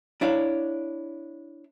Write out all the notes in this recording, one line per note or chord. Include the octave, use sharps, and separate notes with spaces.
D4 E4 C#5 F5